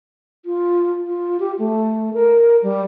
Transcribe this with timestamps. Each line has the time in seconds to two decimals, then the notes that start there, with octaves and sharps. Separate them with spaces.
0.45 F4
1.08 F4
1.40 G4
1.59 A3
2.14 A#4
2.63 G3